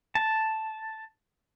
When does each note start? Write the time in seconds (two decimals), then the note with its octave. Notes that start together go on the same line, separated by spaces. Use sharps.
0.15 A5